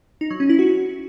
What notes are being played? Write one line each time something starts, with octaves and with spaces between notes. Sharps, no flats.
D#4
F#3
C#4
E4
F#4